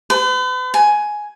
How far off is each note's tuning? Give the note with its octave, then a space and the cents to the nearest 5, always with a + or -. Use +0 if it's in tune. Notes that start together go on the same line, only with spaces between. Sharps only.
B4 +40
G#5 +10